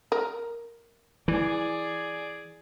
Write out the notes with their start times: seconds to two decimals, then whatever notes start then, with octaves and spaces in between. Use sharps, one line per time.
0.12 A#4
1.28 E3 G#4 D5